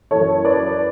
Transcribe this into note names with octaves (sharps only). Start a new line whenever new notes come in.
F#2 E3 A4 C#5
B4 D5